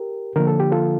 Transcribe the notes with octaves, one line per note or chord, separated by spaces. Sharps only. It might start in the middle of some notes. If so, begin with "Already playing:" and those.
Already playing: G4 A#4
D3 F3 A#3 A#4
A4
G4
F4 A4